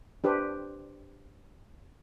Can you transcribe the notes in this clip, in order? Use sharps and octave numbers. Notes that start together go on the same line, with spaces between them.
D4 G4 B4 C5